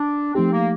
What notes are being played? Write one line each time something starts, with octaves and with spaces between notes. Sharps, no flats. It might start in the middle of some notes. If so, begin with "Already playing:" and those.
Already playing: D4
F3 A3 C4 D#4 G4
A#3